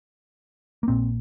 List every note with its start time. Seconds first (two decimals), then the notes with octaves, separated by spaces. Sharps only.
0.83 A#3
0.88 A#1 A#2 C4